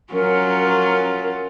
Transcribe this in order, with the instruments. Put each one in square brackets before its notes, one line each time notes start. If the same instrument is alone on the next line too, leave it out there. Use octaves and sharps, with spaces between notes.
[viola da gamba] F#3 C#4 F4 [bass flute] A#4